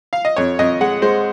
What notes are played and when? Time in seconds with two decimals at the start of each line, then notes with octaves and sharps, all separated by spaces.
0.13 F5
0.25 D#5
0.36 F2 C#5
0.59 F2 D#5
0.81 G#3 F#5
1.02 G#3 C5